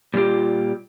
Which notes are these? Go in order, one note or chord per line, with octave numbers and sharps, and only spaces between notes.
A#2 G3 G#3 F4 G4